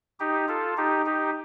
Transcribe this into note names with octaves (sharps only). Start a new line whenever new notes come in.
D#4 G4
F4 A4
D#4 G4
D#4 G4